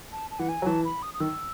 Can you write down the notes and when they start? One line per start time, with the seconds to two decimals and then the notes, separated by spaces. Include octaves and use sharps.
0.12 A5
0.31 A5
0.39 E3 F#5
0.49 G#5
0.62 F#3
0.66 E3 A5
0.85 B5
1.03 D#6
1.14 D#6
1.20 D#3 E6